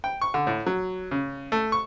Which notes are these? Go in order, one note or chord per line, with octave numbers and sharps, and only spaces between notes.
G5
C#6
D3
A2
F#3
C#3
A3
C#6